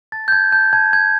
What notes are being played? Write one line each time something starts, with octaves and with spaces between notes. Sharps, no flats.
A5 A6
G6
A5 G#6
A5 G6
A5 G#6
A5 G#6